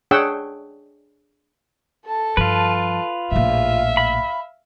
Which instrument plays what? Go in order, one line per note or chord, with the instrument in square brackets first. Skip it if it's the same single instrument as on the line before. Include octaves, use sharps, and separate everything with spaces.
[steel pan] D4 G#4 C#5 F#5 G5 E6
[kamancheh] A4 A5
[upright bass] G2 F3 [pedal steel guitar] F4 B4
[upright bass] A#1 A2 [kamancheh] E5 F5
[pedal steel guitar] B5